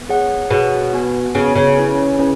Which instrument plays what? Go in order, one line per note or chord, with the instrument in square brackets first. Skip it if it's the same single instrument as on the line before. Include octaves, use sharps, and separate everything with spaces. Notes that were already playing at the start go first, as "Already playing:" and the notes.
Already playing: [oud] B3
[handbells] G#4 C#5 F#5
[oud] B2 [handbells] G#4 C#5 F#5
[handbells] B3 F#4 B4 G#5
[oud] C#3 [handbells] B3 F#4 B4 G#5
[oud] C#3
[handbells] C#4 E4 B4 G#5
C#4 E4 B4 G#5